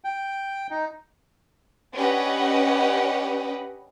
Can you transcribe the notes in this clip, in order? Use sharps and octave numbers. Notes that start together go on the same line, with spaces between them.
G5
D#4
C#4 D4 G4 B4 D#5 F#5